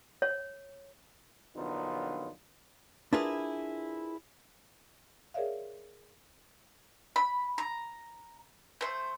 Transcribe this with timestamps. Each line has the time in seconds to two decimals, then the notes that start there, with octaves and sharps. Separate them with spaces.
0.22 C#5
1.56 A#1 D3 F#3 B3 D#4 F4
3.13 D4 E4 F4 G#4 A#4 B4
5.34 G#4 A#4 C#5 D5 E5 F5
7.16 B5
7.58 A#5
8.81 A3 C5